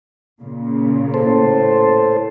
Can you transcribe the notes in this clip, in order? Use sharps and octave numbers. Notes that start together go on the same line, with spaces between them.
A#2 C#3
A2 A4 C5